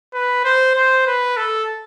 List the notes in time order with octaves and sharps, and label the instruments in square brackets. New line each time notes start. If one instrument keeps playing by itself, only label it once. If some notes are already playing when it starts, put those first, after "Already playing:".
[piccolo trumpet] B4
C5
C5
B4
A4